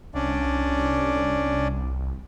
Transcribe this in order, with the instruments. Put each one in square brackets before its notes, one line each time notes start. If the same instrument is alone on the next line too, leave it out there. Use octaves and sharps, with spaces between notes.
[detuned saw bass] C2 [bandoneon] C#4 D4 D5